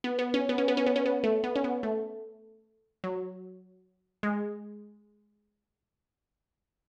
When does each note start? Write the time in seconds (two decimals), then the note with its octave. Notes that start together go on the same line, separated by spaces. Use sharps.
0.04 B3
0.19 B3
0.34 C#4
0.49 B3
0.58 C#4
0.68 B3
0.77 C#4
0.86 B3
0.96 C#4
1.06 B3
1.24 A3
1.44 B3
1.56 C#4
1.64 B3
1.83 A3
3.04 F#3
4.23 G#3